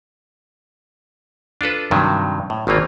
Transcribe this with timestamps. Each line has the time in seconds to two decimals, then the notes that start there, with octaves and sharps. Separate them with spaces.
1.61 D4 F4 A4 B4
1.91 G2 C3 D#3 F#3
2.50 A2
2.67 G#1 D#3 E3 A#3 F4